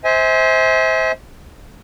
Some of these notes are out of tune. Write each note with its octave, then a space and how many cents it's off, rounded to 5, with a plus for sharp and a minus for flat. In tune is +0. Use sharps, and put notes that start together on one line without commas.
C5 +0 E5 -40 G#5 +0